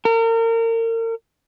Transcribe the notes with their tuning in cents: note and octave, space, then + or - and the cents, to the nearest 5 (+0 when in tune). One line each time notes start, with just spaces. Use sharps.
A#4 -35